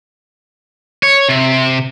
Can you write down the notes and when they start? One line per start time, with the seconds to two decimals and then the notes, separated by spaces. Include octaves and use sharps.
1.03 C#5
1.29 C3